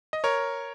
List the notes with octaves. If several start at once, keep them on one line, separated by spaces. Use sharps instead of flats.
D#5
A#4 C#5